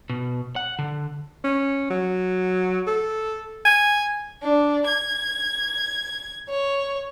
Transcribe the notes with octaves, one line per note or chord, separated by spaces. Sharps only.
B2
F#5
D3
C#4
F#3
A4
G#5
D4
G#6
C#5